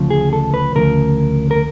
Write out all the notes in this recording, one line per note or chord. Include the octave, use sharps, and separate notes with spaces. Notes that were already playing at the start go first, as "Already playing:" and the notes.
Already playing: D2 C#3 F3
G#4
A4
B4
D2 C#3 F3 A#4
A#4